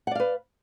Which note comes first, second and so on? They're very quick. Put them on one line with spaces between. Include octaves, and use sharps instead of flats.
F#5 D5 F5 B4